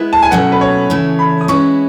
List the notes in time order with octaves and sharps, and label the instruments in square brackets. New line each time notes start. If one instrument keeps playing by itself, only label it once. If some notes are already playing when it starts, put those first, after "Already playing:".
Already playing: [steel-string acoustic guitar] G#3 B3 E4 B4
[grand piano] A5
G#5
[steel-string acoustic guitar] B2 F#3 A3 C#4 [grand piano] F#5
[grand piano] B4
C#5
[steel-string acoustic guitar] C#3 E3 A3
[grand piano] B5
D#6
[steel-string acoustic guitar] G#3 C#4 E4 B4 [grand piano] C#6